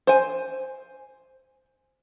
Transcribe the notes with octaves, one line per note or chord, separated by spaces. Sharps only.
C5 G#5